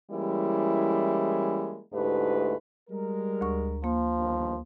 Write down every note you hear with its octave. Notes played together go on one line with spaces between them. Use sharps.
E3 G3 G#3 A#3 C#4 E4
D2 G#2 A3 E4 G4 B4
G3 G#3 A#4
D2 C#6
F3 A#3
G1 D#2